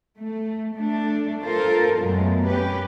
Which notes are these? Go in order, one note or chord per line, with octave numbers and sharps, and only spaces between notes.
A3
A3 D4
F4 A4 A#4 C5
F#2 B2 G#3 A3
C#4 G4 B4